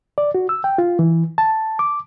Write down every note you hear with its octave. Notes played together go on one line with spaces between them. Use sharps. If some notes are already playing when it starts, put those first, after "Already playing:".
D5
F#4
E6
G5
F4
E3
A5
D6